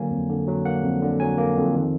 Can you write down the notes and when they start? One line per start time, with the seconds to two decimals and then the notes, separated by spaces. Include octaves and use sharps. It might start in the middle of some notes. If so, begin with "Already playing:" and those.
Already playing: D3 F#3 A#3 G#5
0.11 F2
0.29 D3
0.48 F#3
0.65 A#3 F#5
0.83 F2
1.02 D3
1.20 F#3 G#5
1.38 A#3
1.56 F2
1.74 D#3